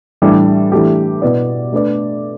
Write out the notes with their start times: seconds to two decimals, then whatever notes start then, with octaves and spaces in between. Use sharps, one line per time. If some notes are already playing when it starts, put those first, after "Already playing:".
0.22 A2 E3 G3 D4 G4
0.72 E3 A3 D4 G4
1.22 B2 B3 E4 B4 D5
1.72 A3 D4 B4 D5